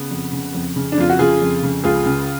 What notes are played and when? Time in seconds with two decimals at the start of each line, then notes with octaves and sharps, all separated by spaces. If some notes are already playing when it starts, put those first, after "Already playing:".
Already playing: C#3 B3
0.11 F2
0.33 C#3
0.55 F2
0.76 C#3
0.92 D4
0.98 F2 F4
1.10 F#4
1.19 C#3 F4 G#4
1.42 F2
1.63 C#3
1.84 C#2 F4 G#4
2.06 C#3